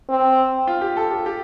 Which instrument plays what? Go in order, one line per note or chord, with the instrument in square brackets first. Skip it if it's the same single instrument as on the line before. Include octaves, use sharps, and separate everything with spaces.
[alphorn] C4
[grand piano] F4
G4
A4
G4
G4